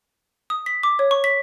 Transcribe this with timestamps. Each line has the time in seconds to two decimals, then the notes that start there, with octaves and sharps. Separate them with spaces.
0.50 D#6
0.66 B6
0.83 D6
0.99 C#5
1.11 C#6
1.24 B6